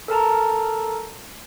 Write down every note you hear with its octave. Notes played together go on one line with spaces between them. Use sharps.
A4 A#4 A5 A#5